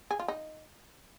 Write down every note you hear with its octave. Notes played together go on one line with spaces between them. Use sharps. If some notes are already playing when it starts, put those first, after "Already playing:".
G#4
F4
D#4